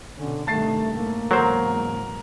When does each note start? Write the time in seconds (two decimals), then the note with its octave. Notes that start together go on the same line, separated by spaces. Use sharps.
0.17 B2 D3 C#4
0.47 G2 C3 D#3 A3 A5 A6 C7
0.94 A2 A3 A#3
1.31 E2 G#2 C#3 F#3 A#4 C5